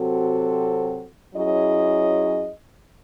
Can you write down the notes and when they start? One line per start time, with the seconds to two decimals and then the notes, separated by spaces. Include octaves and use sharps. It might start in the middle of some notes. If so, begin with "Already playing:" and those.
Already playing: C3 F#3 C4 F#4 A4
1.34 F#3 C#4 E4 G#4 D#5